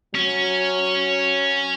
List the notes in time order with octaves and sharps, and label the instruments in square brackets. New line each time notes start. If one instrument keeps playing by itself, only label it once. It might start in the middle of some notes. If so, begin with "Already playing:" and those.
[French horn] F#3 [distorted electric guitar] C#4